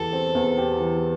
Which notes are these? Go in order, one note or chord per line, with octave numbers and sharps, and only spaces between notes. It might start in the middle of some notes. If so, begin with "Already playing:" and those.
Already playing: E2 E3 G4 A4
C4
E2
G4
E3